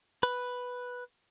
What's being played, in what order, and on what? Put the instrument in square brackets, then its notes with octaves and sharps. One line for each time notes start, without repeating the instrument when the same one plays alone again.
[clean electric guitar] B4